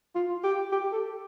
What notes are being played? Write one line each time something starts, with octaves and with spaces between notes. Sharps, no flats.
F4
G4
G4
A4